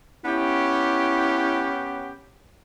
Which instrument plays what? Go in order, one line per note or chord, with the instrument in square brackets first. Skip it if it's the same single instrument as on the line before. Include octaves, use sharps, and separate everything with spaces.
[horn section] B3 C#4 G4 [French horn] E4